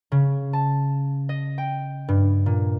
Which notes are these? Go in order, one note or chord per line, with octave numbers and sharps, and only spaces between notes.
C#3
A5
D#5
G5
G2
A#2